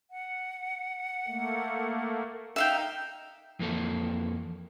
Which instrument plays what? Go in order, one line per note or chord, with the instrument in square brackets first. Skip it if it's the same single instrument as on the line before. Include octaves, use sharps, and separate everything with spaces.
[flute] F#5
[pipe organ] A3 A#3
[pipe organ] D#4 [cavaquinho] E5 F5 G5
[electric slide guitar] F2 E3 A#3 A4